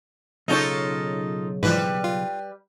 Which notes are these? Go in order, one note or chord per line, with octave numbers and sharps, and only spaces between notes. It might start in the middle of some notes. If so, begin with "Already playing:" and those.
B1 C#3 D#4 F4 A4 C#5
G#2 E3 F3 G3 B4
F4